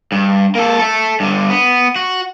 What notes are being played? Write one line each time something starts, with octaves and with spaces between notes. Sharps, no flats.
G2
A#3 A4
A4 E5
G2 D3
B3
F#4